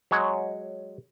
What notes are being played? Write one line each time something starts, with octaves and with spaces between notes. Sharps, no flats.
F#3 G#3 C#5